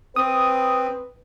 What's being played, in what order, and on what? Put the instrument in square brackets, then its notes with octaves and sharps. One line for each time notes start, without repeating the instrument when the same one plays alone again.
[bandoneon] C4 [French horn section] B4 [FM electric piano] D#6